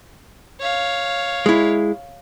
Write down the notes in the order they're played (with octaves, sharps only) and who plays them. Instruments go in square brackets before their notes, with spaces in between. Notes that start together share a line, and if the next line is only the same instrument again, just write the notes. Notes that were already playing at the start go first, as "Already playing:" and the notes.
[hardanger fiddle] C#5 F5
[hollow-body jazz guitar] G#3 E4